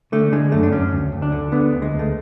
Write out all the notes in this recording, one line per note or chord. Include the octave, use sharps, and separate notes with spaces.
D3 A3
D3 G#3
F#2 A3
D4
F#2 C#4
D2
D2
D4
D3
D3 B3
D2
G#3
D2
A3